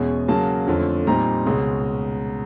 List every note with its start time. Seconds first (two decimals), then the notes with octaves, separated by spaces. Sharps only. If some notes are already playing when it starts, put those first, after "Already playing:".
Already playing: E2 B2 G#3 C#4 G#5
0.28 C#3 F#3 A#3 A5
0.67 F2 D3 F3 A3 C#4
1.07 A#2 G3 C4 D#4 A#5
1.46 C#2 B2 G#3 C#4